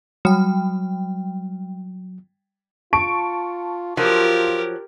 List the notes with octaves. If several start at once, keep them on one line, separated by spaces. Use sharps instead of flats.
F#3 G3 G5
F4 A5 C#6 D7
F3 F#3 F4 G4 A#4